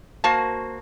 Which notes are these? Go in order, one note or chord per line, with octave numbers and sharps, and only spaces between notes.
A#3 F#4 C5 A5